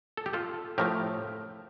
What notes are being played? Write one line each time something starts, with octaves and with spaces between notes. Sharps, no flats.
A4
G4
F4 A4
A2 F3 A3 G4 A#4